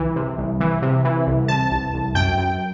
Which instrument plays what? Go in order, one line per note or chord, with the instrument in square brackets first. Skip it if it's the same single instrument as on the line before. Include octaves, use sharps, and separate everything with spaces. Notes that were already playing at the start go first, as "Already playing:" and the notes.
Already playing: [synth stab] C2 E3
C3
C2
E3
C3
E3
C2
C3 A5
C2
C2
F#2 G5
F#2